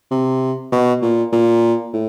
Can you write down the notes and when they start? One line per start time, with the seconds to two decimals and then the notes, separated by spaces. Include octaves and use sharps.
0.11 C3
0.72 B2
1.02 A#2
1.33 A#2
1.94 A2